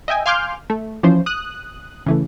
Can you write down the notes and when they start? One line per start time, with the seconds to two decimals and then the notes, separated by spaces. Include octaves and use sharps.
0.08 D#5 E5 G5 G#5
0.26 F5 G#5 C6 D6 F6 G6
0.70 A3
1.03 E3 F3 C#4 C5
1.26 D#6 F#6
2.06 C#3 E3 A3